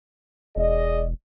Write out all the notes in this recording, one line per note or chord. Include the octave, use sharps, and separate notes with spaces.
E1 G#4 D5 D#5